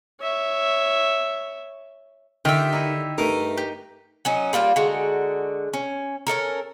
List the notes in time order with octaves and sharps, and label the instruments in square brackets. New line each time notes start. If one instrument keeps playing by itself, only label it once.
[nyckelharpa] C#5 E5
[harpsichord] D3 [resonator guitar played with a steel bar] D#3 [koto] F4 [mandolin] G4 E5
[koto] D#4 E4
[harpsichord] G2 A3 [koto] D#4 [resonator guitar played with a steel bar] A#4
[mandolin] G4
[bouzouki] F#3 C#4 D#4
G3 A#3 F4 D5
D3 G#3 F#4 A#5
C#4
C#4 D#4 A4 A#4